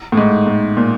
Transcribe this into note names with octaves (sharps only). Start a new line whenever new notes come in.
A2
G#2
A2
A#2